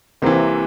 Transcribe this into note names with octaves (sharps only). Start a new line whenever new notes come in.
C2 C3 E3 A#3 C4